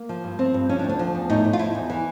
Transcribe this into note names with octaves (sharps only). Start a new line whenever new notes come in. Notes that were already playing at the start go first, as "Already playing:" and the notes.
Already playing: A#3
F3
G2
F3 C4
G2
F3 C#4
D4
D2
D4
F3
E2
A2 D#4
A2
F4
F3 E4
E2
E3